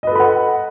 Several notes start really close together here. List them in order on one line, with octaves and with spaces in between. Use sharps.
D#5 B4 A4 B5 F#5